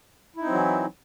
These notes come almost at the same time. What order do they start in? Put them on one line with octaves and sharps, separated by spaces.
E4 D#4 C4 F#3 E3